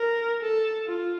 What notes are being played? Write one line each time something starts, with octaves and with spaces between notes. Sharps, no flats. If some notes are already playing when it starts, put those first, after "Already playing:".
Already playing: A#4
A4
F4